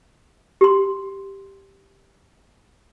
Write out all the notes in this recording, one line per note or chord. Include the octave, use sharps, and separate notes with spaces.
G4 C6